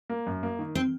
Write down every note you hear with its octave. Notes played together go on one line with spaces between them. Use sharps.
A#3
F#2
A#3
D#3
C4